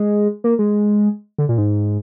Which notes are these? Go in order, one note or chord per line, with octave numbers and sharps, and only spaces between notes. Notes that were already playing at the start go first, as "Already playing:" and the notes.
Already playing: G#3
A#3
G#3
D3
A#2
G#2